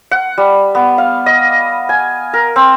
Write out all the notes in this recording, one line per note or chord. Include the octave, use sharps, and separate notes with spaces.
F#5
G3
B3
F5
D#5
G#5
A#4
C4